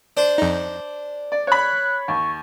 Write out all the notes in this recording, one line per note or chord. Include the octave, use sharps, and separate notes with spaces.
D4 C5
F2 D#4
D5
C#5 B5 F#6
D#2 C#6